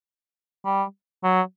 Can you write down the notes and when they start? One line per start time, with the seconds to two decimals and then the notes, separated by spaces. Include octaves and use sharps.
0.66 G3
1.24 F#3